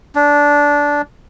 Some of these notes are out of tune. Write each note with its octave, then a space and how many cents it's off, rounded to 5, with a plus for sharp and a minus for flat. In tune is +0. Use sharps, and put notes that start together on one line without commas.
D4 -15